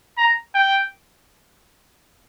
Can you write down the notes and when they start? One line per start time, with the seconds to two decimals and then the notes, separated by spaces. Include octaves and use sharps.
0.18 A#5
0.55 G5